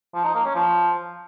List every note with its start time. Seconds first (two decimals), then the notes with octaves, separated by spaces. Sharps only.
0.14 F3
0.24 D#4
0.35 A#3
0.45 C#4
0.55 F3